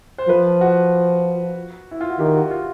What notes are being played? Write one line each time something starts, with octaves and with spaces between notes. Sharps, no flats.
C5
F3 B4
F#4
E4
F4
F#4
D#3 G4
F#4
F4